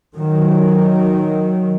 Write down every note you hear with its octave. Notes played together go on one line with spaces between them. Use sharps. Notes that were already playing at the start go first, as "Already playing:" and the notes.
D#3 F#3